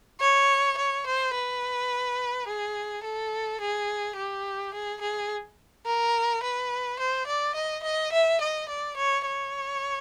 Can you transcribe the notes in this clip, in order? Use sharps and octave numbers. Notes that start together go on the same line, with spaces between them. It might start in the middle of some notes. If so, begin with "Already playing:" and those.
C#5
C#5
C5
B4
G#4
A4
G#4
G4
G#4
G#4
A#4
B4
C5
D5
D#5
D#5
E5
D#5
D5
C#5
C#5